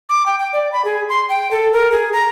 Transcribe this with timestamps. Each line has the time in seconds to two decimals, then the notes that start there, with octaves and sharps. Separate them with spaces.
0.09 D6
0.26 G5
0.39 G5
0.53 D5
0.72 B5
0.85 G#4
1.09 C6
1.29 G5
1.51 A4
1.73 A#4
1.92 G#4
2.13 A#5